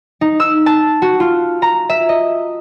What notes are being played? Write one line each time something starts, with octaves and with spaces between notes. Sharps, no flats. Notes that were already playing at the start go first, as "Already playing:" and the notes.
D#4
E6
A5
F#4
F4
A#5
E5
D#5